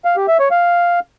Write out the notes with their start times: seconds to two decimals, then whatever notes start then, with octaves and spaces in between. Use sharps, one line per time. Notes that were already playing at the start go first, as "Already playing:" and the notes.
0.05 F5
0.16 G4
0.28 E5
0.39 C#5
0.51 F5